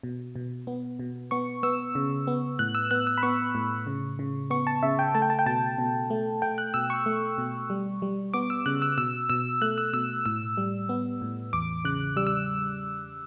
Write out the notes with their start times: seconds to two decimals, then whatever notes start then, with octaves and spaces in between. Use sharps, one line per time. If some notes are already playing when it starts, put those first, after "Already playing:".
0.03 B2
0.36 B2
0.67 B3
0.99 B2
1.31 B3 C#6
1.63 B3 E6
1.95 C#3
2.27 B3
2.59 A2 F#6
2.75 E6
2.91 B3 F#6
3.07 E6
3.18 B5
3.23 B3 C#6
3.55 A2
3.87 C#3
4.19 C#3
4.50 B3 C#6
4.67 A5
4.83 C#3 E5
4.99 G5
5.15 A3 A5
5.22 G5
5.30 A5
5.39 G5
5.46 B2 A5
5.78 B2
6.10 A3
6.42 A3 G5
6.58 F#6
6.74 B2 E6
6.90 C#6
7.06 A3
7.38 B2
7.70 G3
8.02 G3
8.34 B3 D6
8.50 E6
8.66 C#3 F#6
8.82 E6
8.98 B2 E6
9.30 B2 E6
9.62 A3 F#6
9.78 E6
9.93 B2 E6
10.26 A2 E6
10.57 G3
10.89 B3
11.22 A2
11.53 E2 D6
11.85 C#3 F#6
12.16 G3 E6
12.27 E6